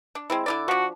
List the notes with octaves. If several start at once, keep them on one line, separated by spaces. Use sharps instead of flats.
D4
G#3 C4 E4
D3 E4 D5
F3 D4 F#4